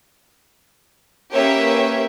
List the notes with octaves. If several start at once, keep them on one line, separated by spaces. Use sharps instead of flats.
A#3 C#4 G4 B4 C#5 E5